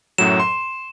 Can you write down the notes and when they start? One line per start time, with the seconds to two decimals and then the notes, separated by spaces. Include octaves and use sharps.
0.18 F#2 A2 F#3 E7
0.40 C6